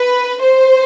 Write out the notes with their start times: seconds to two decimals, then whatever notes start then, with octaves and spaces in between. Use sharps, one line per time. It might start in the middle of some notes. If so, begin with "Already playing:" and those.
Already playing: B4
0.41 C5